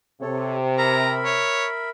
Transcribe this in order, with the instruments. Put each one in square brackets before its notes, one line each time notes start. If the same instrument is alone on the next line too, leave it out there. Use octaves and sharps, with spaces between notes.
[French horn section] C3 [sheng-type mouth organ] A4 C#5
[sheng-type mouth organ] A#4 E5 B5 [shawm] A#5
[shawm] C#5